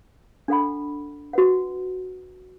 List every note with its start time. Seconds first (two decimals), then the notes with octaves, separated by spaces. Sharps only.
0.48 D4 A4 F#5 B5
1.33 F#4 B4 F#5